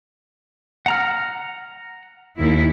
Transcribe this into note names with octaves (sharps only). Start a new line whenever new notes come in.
F#5 A#5 F6
D#2 E4